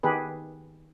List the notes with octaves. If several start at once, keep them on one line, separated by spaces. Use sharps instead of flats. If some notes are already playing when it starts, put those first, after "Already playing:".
D#3 B3 G4 G#4 B4